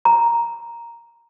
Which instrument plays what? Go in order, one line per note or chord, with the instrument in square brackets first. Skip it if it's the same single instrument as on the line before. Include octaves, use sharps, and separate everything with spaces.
[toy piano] A#5